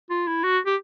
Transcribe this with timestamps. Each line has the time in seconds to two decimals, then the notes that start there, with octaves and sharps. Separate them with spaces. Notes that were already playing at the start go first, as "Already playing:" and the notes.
0.10 F4
0.27 E4
0.44 F#4
0.66 G4